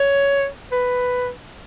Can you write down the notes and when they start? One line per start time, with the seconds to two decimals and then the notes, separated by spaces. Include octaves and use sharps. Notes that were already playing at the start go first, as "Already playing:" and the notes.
Already playing: C#5
0.72 B4